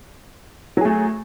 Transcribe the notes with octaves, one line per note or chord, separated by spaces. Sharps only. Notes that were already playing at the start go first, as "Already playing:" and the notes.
F#3 A3 G#4